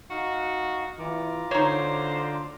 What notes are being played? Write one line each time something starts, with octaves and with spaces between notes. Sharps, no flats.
D#4 F#4 F5
E3 F4 A#5 D6
D3 D#4 C5 C#5